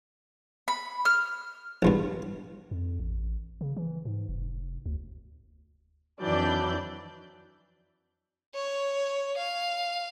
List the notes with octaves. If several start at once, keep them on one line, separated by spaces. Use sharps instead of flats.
B5
F6
A#1 E2 G2
F2
A1
C#3
E3
G#2
F1
D2
F2 D#3 E3 F#3 D4 D5 G6
C#5
F5